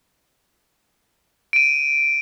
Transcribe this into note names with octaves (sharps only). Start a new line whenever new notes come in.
D7 D#7